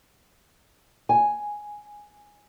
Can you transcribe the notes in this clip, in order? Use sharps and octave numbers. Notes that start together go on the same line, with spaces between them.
G#5